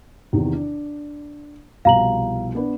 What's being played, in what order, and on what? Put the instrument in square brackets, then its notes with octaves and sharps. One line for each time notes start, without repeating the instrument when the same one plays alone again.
[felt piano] E2 C3 D#3
D4
[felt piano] C2 B2 F3 [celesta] F5 A#5 F#7
[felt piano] B3 D4 B4